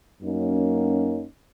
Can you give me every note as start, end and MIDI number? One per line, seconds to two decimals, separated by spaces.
0.23 1.24 42
0.23 1.24 54
0.23 1.24 58
0.23 1.24 61
0.23 1.24 63